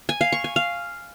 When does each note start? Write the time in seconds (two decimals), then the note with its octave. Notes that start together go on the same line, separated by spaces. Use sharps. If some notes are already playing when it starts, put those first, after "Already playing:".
0.09 G#5
0.21 F5
0.32 C#6
0.44 G#5
0.56 F5